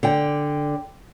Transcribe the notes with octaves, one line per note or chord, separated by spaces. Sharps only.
D3 D5 G5